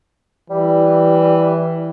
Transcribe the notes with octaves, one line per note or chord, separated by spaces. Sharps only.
E3 G3